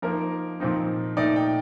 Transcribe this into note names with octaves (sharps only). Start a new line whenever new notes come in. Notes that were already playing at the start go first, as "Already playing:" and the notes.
F3 A#3 D#4 A#4
A#2 F3 C4 D#4
A#2 A3 D#4 D5
G5